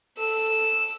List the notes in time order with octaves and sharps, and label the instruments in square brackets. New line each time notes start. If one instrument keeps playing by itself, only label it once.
[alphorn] A4 [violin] E6